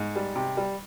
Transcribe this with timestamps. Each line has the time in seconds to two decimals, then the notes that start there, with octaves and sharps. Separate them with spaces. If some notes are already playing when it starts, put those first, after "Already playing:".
Already playing: G#2
0.15 G3
0.36 C3
0.57 G3